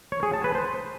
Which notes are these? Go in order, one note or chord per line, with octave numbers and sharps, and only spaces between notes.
C#5
G#4
A5
B4
C5